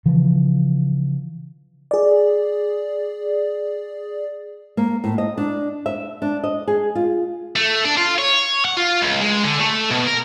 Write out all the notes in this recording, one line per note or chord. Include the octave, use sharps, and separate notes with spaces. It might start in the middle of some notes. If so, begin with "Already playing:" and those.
C#3 E3 F3
G#4 D5
A#3
A2
D#5
D4
E5
D4
D#5
G#4
F4
A3
D4
F4
C#5
F#5
F4
C#2
G#3
D3
A3
B2
A#4